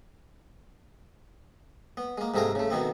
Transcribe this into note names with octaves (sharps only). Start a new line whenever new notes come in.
B3
G#3 A#3
G#2 C3 A3 G#4 A#4 F5
C#3 A3
B2 D#3 B3 C4